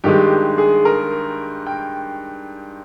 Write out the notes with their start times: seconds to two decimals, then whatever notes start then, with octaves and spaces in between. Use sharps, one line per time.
0.04 G2 D#3 G#3 G4
0.58 G#4
0.85 A#4
1.67 G5